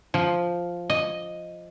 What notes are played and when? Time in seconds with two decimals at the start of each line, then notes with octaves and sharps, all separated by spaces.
0.14 F3
0.90 D#5